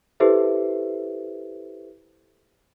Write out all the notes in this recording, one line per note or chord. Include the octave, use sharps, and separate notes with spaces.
E4 G4 A4 B4 C5 E5